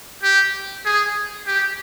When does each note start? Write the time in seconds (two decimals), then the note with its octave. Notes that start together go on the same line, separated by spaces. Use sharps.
0.23 G4
0.85 G#4
1.47 G4